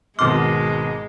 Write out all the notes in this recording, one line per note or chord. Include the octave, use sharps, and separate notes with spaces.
G#1 B2 G#3 D#5 C6 D6 F6